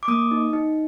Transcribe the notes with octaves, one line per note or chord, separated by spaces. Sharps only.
D6
A#3 D#6
D#4
D#4